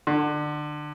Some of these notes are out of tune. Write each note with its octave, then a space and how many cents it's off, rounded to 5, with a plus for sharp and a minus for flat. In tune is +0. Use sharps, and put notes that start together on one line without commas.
D3 +25